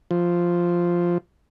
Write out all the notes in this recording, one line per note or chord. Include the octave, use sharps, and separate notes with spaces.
F3